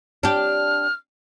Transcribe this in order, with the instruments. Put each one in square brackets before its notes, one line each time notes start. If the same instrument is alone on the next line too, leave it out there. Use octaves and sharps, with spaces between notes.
[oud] D4 G4 [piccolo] F6